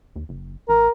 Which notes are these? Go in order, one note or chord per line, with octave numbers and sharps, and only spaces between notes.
D#2
F#1
A1 A#4